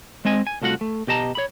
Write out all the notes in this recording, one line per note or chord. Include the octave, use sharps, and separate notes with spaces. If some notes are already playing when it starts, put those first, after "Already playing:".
G#3 C4 D#5 G#5
G#5
C2 A3 F4 F#4 F#5
A3
B2 G4 D#5 A5 A#5
C#5 B5